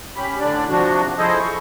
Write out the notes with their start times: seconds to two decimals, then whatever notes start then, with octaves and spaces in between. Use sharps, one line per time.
0.16 C#4 G4 B5
0.40 A2 D3 D4 D5
0.69 C3 F3 D4 F#4
1.18 F3 E4 G#4 A4 C5 D#5
1.39 C#6